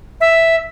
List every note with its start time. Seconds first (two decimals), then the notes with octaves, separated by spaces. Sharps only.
0.21 E5